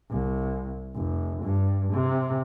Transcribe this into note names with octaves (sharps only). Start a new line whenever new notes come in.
C2
F1
G2
C3